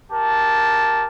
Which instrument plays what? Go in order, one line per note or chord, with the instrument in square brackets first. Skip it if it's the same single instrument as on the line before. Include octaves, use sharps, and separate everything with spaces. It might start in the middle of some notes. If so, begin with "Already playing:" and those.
[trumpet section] G4 A#4 A5